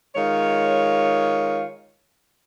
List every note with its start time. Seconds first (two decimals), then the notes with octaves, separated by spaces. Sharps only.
0.15 D#3 G#3 F4 C#5